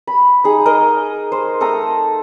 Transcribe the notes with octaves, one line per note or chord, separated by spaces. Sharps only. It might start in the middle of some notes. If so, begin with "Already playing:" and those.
B5
D#4 G#4
A#4 D#5
C5
A3 A4 A#5 D#6